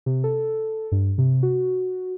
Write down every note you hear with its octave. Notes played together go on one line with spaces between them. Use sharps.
C3
A4
G2
C3
F#4